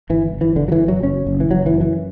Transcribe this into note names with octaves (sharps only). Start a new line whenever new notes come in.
G1 E3
G1
E3
G1 D3
F#3
E3
G1
F#3
F#1 C#4
F#1
E3
F#1 F#3
E3
F#2
E3